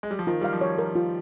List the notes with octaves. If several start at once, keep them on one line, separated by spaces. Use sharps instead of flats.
G#3
G3
F3
D#3 F4
G3 F5
F3
C#5
A#4
F4